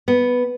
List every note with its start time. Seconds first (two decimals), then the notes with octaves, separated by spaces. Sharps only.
0.08 B3